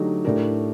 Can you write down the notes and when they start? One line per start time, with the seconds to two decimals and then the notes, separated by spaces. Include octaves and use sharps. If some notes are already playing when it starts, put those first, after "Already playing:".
Already playing: D3 F#3 A3 D#4 G4
0.25 A2 A3 D4 G4 A#4